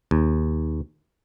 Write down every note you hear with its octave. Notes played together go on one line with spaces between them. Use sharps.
D#2